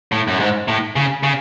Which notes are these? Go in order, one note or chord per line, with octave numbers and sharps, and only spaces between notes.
A2
F#2
G#2
A2
C#3
C#3